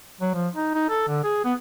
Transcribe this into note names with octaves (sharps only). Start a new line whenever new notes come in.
F#3
F3
D#4
D#4
A4
D3
G#4
B3